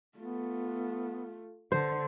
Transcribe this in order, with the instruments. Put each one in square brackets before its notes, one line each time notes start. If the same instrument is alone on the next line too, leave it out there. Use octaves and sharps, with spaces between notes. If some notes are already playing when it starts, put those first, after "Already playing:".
[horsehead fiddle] A3 F4 [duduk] B3
[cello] D3 [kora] C5